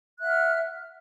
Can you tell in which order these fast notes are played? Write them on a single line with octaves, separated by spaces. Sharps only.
F#6 E5 F#5 F6